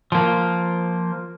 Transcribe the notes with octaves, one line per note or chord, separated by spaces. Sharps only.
F3 A#3